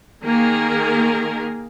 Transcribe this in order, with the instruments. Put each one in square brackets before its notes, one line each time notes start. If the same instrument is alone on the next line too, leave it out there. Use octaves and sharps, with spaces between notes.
[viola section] D#3 A#3 G#4 A#4